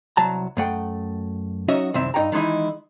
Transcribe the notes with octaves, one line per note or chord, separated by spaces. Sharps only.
C2 F#3 A5 A#5
F#2 A3 F#5 G5
F#3 C#4 D#4 F#4 D#5 E5
C2 F#2 D#3 C4 E5
G2 D#4 C#5 G5 A#5
D#3 E3 G#3 D#4 E4